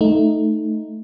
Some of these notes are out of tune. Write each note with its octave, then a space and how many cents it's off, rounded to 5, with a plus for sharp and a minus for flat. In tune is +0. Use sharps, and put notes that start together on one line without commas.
A3 +0 D#4 +0